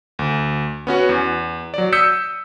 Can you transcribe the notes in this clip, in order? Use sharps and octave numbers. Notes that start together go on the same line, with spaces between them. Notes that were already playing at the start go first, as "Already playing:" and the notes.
D2
B3 C#4 F#4
E2
F#3 D5
D#6 E6 G6 B6 C#7